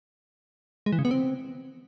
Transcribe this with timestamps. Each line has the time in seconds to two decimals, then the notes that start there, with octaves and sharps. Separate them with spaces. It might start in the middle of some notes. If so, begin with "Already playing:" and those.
0.86 G#3
0.92 E3
0.99 C#3
1.05 B3
1.11 C4